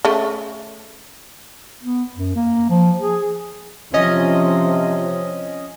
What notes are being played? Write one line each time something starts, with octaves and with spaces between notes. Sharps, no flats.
C#3 A3
B3
F#2
A#3
F3
G#4
C3 F3 C#4 D#5